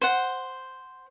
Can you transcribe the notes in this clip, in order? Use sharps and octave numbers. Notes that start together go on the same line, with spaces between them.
C5 F#5